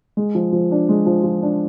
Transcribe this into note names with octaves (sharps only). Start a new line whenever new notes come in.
G#3
F3
F3
D4
G#3
F3
F3
D4